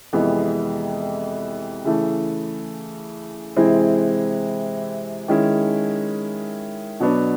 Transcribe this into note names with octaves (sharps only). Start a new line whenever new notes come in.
F2 C3 E3 G#3 B3
C#3 E3 A3
C3 E3 G#3 C4 E4
D#3 G#3 C#4 E4
B2 F#3 B3 D4